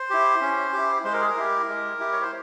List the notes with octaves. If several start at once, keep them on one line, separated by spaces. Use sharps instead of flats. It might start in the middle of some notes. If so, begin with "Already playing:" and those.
Already playing: C5
E4 G4
C#4
E4 G4
G#3 C5
A#4
G#4
A#4
E4 G4
G#3
E4 G4
C#5
C5